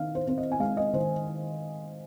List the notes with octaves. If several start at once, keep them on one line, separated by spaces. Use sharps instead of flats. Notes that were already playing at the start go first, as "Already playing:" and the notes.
Already playing: D#3 D#4 F5
C5
C4 C5
D#5
G#5
G#3 F5
D#5
D#3 C5